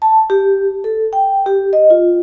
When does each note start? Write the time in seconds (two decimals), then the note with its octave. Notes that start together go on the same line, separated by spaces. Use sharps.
0.02 A5
0.30 G4
0.84 A4
1.13 G5
1.46 G4
1.73 D#5
1.90 F4